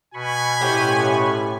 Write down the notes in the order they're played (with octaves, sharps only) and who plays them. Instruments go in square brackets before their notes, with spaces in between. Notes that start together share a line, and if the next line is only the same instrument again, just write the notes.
[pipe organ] B2 B5 C#6 [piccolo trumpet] G#5
[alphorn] A2 [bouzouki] C#4 G4 C5